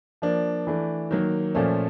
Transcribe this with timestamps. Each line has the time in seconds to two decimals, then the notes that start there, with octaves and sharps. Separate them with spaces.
0.22 F3 A#3 D4
0.67 E3 A3 D4
1.11 D#3 F#3 A#3
1.55 A#2 F3 A3 C#4